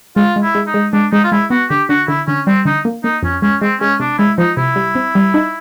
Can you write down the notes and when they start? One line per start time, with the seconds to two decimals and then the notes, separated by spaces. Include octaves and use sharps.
0.16 G#3 F4
0.36 G#3
0.42 E4
0.55 G#3
0.67 D#4
0.74 G#3
0.93 G#3 D4
1.12 G#3 D#4
1.24 F4
1.32 G#3 E4
1.50 B3 F#4
1.70 D3 G4
1.89 D3 F#4
2.08 D3 E4
2.27 D3 C#4
2.47 G3 C4
2.65 D3 D#4
2.85 A#3
3.04 A#3 D#4
3.23 F2 C#4
3.42 G#3 C#4
3.61 G#3 C4
3.80 G#3 C#4
4.00 C3 D4
4.18 G#3 E4
4.38 F3 D#4
4.57 C3 E4
4.76 G3
4.95 C4
5.15 G3
5.34 D#4